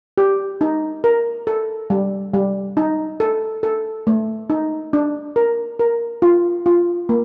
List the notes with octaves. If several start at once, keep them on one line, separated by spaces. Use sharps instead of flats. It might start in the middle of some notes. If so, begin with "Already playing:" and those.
G4
D#4
A#4
A4
G3
G3
D#4
A4
A4
A3
D#4
D4
A#4
A#4
F4
F4
A#3